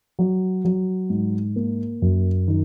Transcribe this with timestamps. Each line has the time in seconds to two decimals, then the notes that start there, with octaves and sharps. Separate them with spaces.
0.19 F#3
0.65 F#3
1.10 G#2
1.56 A#3
2.02 F#2
2.48 D#3